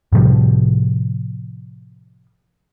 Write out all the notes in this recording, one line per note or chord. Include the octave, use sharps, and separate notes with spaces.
A2 C3 F3 G3